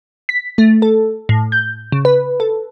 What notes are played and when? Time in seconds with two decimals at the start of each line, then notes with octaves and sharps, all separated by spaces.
0.29 B6
0.58 A3
0.82 A4
1.29 A2
1.52 G6
1.92 C#3
2.05 B4
2.40 A4